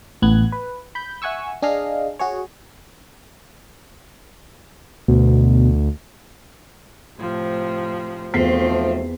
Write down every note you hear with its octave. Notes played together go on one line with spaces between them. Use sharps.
A1 A2 B3 F#6 G#6
B4
B5 G6
E5 F#5 G#5 C#6 E6
D4 G#4 D#5 F5
F#4 G#4 C#5
D2 B2
A2 C3 F3
B1 E2 F3 A3 C4 F4 B6 C7